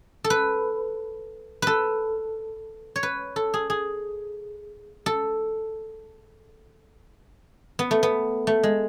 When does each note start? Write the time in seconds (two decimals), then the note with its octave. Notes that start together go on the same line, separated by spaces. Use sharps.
0.24 A4
0.30 B4
1.62 A4 B4
2.96 C#5
3.03 B4
3.36 A4
3.54 G#4
3.70 G#4
5.06 A4
7.79 B3
7.91 A3
8.03 B3
8.47 A3
8.63 G#3